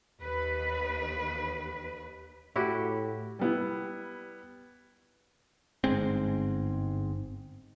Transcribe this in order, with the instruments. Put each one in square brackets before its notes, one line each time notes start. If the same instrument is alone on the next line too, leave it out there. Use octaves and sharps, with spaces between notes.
[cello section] D#2 B4
[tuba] A2 [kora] E4 F#4 G4
[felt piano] G3 B3 E4
[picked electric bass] G1 G#2 G#3 C4